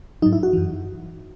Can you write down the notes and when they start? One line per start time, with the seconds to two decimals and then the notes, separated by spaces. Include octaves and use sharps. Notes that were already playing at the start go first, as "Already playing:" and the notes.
0.22 G#2 F#3 D#4
0.33 E4
0.43 F#4
0.53 F#2 E3